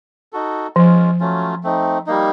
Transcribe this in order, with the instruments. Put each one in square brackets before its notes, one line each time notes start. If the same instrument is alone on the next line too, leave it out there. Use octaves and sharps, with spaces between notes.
[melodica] D#4 F#4 A4
[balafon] F3 [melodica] G#3 C#4 F4
[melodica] F#3 A3 C#4 F4
A3 C4 D#4
G3 A#3 D#4